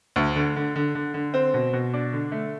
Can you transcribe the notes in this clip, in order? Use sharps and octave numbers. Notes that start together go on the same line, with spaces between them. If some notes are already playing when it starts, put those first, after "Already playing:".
D2
D3
D3
D3
D3
D3
C4
B2
B2
D4
D3
A3